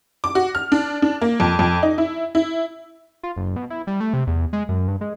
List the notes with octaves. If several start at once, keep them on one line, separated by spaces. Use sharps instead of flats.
D6
F#4
F6
D4
D4
A#3
F2
F2
D#4
E4
E4
F4
F#1
B2
E4
G3
A3
C3
E2
G#3
F#2
G2
G#3